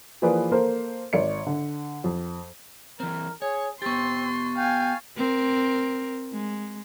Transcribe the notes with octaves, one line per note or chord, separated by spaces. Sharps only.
E3 F3 A#3 G#4 B4 D5
A#3 A4 A#4 C5
G#1 C#5 D5 C#7
D3
F2
E3 C4 A#4
G#4 C#5
B3 C4 G4 C6 C#6 A6
F5 G5 G#5
C4 A#4
G#3